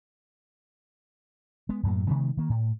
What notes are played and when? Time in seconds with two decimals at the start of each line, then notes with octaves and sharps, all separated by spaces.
1.69 G#3 B3
1.83 F#2 A2 F#3 A#3
2.08 C3 D#3 G#3 B3
2.37 D#3 A#3
2.50 A2